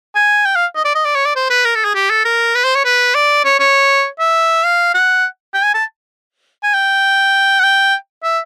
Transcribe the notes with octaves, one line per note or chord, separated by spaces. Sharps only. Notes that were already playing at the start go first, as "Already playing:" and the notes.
G#5
G5
F5
D#5
D5
D#5
D5
C#5
D5
C5
B4
A#4
A4
G#4
G4
A4
A#4
B4
C5
C#5
B4
D5
C#5
C#5
E5
F5
F#5
G5
G#5
A5
G#5
G5
F#5
G5
E5